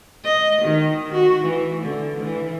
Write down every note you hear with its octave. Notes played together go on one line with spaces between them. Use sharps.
D#5
D#3
F#4
E3
D3
E3